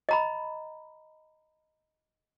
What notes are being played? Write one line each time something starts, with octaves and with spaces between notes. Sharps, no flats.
D#5 A#5 B5